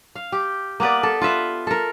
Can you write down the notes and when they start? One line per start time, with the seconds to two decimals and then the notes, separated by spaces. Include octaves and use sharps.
0.15 F5
0.32 G4
0.80 A#3 B3 B4 D5
1.03 A4
1.21 F4 B4 E5
1.67 A4 A#4